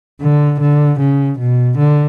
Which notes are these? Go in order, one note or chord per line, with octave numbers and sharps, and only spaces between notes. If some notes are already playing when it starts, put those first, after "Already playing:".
D3
D3
C#3
B2
D3